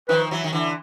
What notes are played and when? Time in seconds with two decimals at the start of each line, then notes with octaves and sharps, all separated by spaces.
0.09 D#3 F3 B4
0.31 E3 F#3
0.44 D#3
0.53 D3 E3